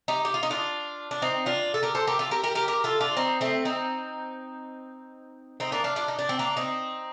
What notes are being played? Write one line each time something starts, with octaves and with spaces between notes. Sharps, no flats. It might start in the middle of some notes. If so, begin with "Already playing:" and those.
D#4 G4
G4
F4
D#4
D4 F4
D4
C4 D#4
D4 F4
A4
G4 A#4
A4 C5
G4 A#4
F4 A4
G4 A#4
G4 A#4
G4 A#4
G4 A#4
F4 A4
D4 F4
C4 D#4
A3 C4
C4 D#4
C4 D#4
A#3 D4
D4 F4
D4 F4
D#4
D4
C4
A#3 D4
C4 D#4